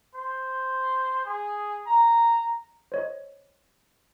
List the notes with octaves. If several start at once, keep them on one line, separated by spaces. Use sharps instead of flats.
C5
G#4
A#5
C5 C#5 D#5